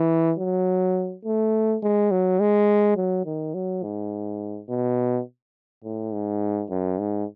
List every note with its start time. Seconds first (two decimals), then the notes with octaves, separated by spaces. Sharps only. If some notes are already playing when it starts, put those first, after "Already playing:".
Already playing: E3
0.38 F#3
1.25 A3
1.83 G#3
2.11 F#3
2.40 G#3
2.96 F#3
3.25 D#3
3.54 F#3
3.83 G#2
4.69 B2
5.84 A2
6.13 G#2
6.70 F#2
6.99 G#2